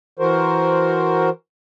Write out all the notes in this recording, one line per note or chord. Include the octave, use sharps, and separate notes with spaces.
E3 F#4 A#4 C5